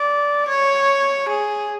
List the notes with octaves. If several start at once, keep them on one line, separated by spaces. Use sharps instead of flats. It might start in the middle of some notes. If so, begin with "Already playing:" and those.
Already playing: D5
C#5
G#4